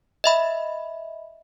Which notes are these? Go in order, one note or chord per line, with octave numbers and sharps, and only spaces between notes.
D#5 E5 B5